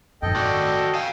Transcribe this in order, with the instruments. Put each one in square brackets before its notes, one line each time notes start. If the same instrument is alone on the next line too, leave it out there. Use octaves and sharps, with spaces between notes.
[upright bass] G#1 F#2 [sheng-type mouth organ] A4 D#5 G5
[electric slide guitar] F#4 D5
[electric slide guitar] F5 G#5 [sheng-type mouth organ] G5